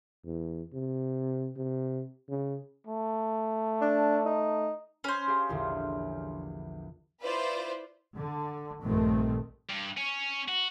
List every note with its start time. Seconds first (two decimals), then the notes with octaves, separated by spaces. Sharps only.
0.25 E2
0.73 C3
1.56 C3
2.29 C#3
2.87 A3
3.81 D4
4.25 D#4
5.04 C#4 B4 C5
5.27 G4 G#4 F5
5.49 A#1 E2 D3
7.22 E4 F4 B4 C5 D5
8.17 D3
8.82 A#1 G2 A#2 D#3 A3 C4
9.70 G2
9.98 C#4
10.49 F#4